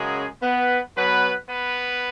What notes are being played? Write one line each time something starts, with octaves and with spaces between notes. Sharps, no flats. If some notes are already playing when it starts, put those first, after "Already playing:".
Already playing: F#2 C#3 F#3 G#3 G#4
B3 B4
B2 F#3 B3 B4
B3 B4